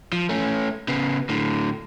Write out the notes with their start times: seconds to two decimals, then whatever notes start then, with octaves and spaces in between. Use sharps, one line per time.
0.13 F3
0.29 A3 C#4
0.88 C#3 B3
1.29 A2 D3